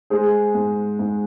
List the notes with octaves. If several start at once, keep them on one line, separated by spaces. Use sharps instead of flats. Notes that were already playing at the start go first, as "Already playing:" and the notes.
G#3 G#4 C5
G#2
G#2